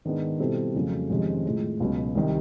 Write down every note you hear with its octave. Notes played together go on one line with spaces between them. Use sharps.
G#2 D#3 G#3 B3 D4
B2 G3 C4 E4 A4
F2 C#3 F#3 A3
F2 C3 D#3 G#3 C#4
A2 F3 G#3
C#2 B2 F#3
C2 C3 D#3